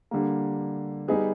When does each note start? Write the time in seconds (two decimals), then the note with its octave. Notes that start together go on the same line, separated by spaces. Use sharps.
0.11 D3 G3 A#3
1.08 G3 B3 D#4 G#4 B4